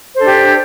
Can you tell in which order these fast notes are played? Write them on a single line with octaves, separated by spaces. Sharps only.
C5 A4 D4 G4